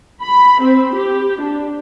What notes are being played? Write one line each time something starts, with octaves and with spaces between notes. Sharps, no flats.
B5
C4
G4
D4